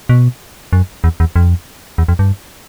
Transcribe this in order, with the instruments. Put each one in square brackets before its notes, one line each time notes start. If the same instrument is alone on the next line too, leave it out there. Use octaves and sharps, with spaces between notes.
[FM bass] B2
F#2
E2
E2
F2
E2
F2
G2